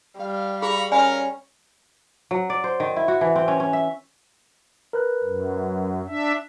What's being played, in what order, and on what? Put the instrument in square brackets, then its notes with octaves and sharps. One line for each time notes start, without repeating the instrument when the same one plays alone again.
[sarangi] G3 [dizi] F5
[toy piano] G#4 [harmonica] A#5 B5 C#6
[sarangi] C#4 [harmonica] A#4 F5 [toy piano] D5 G#5 B5
[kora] F#3
D5
C5
D#3
E4
F#4
E3
C4
C#4
C#4
E5
[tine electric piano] A#4 B4 F#6
[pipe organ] F#2
D4 E5